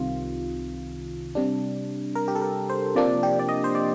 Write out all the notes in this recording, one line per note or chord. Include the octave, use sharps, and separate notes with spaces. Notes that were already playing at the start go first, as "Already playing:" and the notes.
Already playing: C2 C3 D#3 F4
C3 G3 D4
A#4
G4
A4
A#4
C5
C3 F3 A#3 D4 D5
G4
D5
D#5
C5
D5